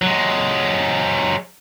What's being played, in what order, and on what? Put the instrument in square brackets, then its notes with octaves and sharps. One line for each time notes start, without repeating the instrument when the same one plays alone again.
[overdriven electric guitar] F#3 G#3